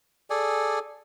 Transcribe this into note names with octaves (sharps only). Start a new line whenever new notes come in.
G#4 A4 D5 G#5